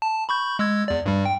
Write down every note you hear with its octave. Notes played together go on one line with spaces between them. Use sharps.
A5
B5 C#6 G6
G#3 E6 G#6
E2 D5
G2 G3
G5